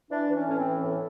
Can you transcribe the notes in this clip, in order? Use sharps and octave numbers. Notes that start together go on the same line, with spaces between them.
E3 D4
E3
C#4
A2 C#4
C4
E3
A2